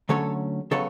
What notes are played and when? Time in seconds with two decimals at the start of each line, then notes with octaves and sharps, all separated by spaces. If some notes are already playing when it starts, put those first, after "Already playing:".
0.09 D3 F#3 A3 C#4 A4 C#5
0.71 C#3 F#3 B3 A4 C#5